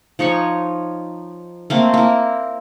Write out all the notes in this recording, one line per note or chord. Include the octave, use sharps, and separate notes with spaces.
F3 D#4 C#5 C#6
A3 A#3 C4
A#3 E4